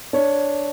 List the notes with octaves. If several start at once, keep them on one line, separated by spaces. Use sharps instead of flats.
D4 C#5